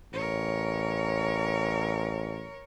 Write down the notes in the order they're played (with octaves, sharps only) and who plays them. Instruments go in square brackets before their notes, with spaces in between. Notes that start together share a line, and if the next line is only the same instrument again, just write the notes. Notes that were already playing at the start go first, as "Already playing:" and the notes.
[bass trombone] A1 [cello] A#4 C#5